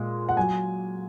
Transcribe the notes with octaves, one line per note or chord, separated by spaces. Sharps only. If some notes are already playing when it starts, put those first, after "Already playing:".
Already playing: A#2 G#3
F#5
F#3 G#5